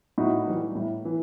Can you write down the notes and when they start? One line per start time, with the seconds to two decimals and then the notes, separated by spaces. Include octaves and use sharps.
0.18 A2 D#4 F#4
0.47 E3 G3
0.75 A2
1.05 E3